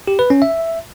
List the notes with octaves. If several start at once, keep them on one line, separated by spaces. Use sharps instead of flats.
G4
B4
C#4
E5